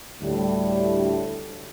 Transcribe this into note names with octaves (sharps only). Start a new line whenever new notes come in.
D2 A2 G3